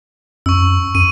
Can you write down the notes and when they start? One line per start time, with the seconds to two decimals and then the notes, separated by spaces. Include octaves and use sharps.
0.46 F#2 C#6 E6
0.95 F#2 D#7